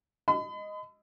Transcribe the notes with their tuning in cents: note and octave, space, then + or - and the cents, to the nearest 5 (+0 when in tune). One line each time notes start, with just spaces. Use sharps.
D#5 +0 B5 +40